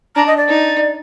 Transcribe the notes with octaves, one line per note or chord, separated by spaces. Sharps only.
D4 A#5
D#5
D5
D#4